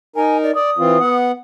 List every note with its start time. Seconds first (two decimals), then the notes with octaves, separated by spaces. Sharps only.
0.16 D#4 A#4 G#5
0.43 D5
0.55 D5 D#6
0.78 E3 C4 F4
1.00 B3 F#5